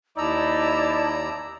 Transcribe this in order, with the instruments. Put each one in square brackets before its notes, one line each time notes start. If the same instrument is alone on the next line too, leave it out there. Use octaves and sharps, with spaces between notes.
[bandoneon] D#2 A#5 E6 [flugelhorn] D#4 [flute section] E4 A5 [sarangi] D5